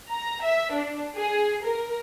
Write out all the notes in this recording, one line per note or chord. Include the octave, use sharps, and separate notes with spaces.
A#5
E5
D4
G#4
A#4